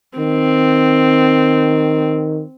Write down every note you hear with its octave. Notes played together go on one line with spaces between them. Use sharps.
D#3 C4